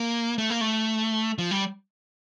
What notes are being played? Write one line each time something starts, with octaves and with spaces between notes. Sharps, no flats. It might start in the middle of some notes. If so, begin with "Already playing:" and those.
Already playing: A#3
A3
A#3
A3
F3
G3